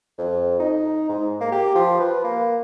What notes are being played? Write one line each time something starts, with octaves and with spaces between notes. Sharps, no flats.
F2
D#4
G#2
A#3
G4
F3
B4
A#3